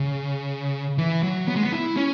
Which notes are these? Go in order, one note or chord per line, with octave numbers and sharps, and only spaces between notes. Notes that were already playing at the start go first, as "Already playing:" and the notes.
Already playing: C#3
E3
F#3
B3
G#3
B3
E4
C#4